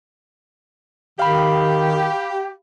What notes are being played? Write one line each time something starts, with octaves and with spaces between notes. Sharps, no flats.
D#3 G4 F5 B5